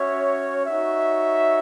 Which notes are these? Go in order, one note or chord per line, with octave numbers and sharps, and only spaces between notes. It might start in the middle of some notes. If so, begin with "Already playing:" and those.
Already playing: C#4 F#4 C#5 E5
D#4 F#4 C#5 E5